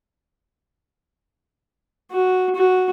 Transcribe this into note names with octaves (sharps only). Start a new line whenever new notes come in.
F#4
F#4